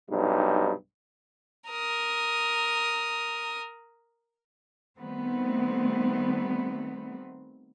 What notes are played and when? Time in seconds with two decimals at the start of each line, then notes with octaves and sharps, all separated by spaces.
0.10 B1 G2 C3 D#4
1.69 A#4 D#6
4.97 D#3 G3 A3 B3 C4